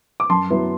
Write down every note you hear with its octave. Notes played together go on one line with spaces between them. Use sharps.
D6
F#2 A5 C6
F#3 B3 E4